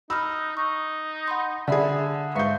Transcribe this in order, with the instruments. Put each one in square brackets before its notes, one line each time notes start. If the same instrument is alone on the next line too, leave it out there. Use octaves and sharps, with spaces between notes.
[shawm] D#4 [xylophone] B5 F6 [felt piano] E6
[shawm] D#4 [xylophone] C#6
[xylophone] F#5 B5 C6
[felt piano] D3 G#4 [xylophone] D5 E5 B5
[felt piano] G#2 G6 [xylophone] B4 E5 F5 [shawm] C#6